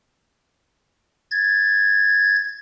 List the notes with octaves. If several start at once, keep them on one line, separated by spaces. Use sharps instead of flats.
G#6 A6